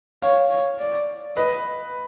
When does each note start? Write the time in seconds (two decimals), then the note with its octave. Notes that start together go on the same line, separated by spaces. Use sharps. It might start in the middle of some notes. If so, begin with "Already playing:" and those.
0.22 C#5 F5
0.51 C#5
0.79 D5
1.36 B4 D#5